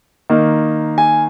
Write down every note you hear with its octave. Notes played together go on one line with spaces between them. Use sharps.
D#3 A#3 D#4
G#5